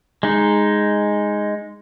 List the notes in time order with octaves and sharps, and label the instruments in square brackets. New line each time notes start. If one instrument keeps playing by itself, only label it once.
[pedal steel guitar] G#3 D#4